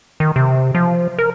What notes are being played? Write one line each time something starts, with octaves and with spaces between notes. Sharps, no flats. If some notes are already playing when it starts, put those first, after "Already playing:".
D#3
C3
F3
A#4